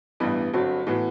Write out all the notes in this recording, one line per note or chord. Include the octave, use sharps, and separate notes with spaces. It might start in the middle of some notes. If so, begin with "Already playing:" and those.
A1 G2 E3 G3 B3
G1 G2 F#3 C4 F#4
A2 E3 B3 F#4